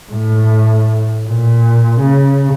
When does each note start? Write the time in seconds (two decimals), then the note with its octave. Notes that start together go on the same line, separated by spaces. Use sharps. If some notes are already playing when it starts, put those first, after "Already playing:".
0.12 A2
1.28 A#2
2.01 C#3